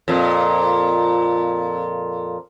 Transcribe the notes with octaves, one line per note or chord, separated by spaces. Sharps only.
F2 A#2